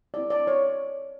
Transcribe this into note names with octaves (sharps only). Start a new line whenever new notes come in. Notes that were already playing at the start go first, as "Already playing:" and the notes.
C4 E4 G4 D5
D5
C#5